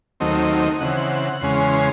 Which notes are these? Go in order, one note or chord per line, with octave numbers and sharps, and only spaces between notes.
D#2 D#3 F#3 A3 C4 D#5
C#3 E3 C4 F#5
E2 C#3 G#3 C#4 C6
C6
C6